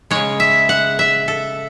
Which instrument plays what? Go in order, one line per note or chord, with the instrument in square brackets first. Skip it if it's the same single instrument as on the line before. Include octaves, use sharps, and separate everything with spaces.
[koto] C#3 G#3 C#5
E5
F#5
E5
A4